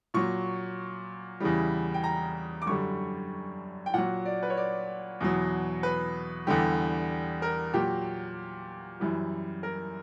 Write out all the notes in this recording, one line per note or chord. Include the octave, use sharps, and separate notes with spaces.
A#2 F#3 C#6
E2 C#3 E3 G3
G5
A#5
D6
F#2 D3 G3 C#6
G5
A#2 F#3 F#5
D5
B4
C#5
D5
E2 B2 F#3
B4
E2 D3 G3 G4
A#4
A#2 F#3 G4
F#2 E3 G3
A#4